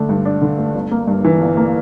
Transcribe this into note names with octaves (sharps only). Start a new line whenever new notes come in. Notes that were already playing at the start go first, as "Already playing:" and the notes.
Already playing: D3 A3 D4
G2
D4
D3
A3
G1
A#3
G2
E3
G1
A#3